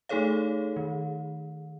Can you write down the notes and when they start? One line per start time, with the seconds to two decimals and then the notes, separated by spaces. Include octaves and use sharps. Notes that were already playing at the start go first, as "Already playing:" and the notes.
0.09 A3 D#4 G#4 A4 C#5 F5
0.76 D#3